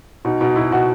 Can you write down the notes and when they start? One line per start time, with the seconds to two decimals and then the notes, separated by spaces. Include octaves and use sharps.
0.25 B2 D#4
0.41 B2 D#4
0.56 B2 E4
0.72 B2 F#4